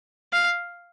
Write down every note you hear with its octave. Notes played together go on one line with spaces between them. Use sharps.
F5